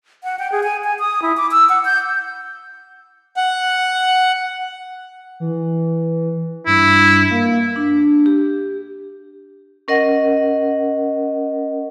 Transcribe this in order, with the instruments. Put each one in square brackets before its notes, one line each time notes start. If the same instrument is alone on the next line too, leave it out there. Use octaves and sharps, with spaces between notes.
[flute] F#5
G5
G#4
G#5
G#5
D#6
E4
D6
E6
F#5
G6
[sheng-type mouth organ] F#5
[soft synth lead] E3
[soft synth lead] G2 [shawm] E4
[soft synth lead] A#3
[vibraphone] D4
G4
C#4 A#4 D#5 F#5